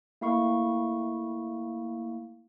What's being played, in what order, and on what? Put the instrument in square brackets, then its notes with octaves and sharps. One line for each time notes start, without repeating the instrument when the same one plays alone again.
[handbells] A3 A#3 E4 F5 B5 C#6